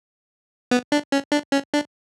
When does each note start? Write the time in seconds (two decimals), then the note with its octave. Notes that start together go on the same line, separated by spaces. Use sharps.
0.71 B3
0.92 D4
1.12 C#4
1.32 D4
1.52 C#4
1.74 D4